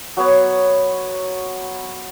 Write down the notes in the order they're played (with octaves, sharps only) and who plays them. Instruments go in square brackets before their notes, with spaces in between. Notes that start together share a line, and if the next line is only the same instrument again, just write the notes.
[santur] F#3 B3 C#5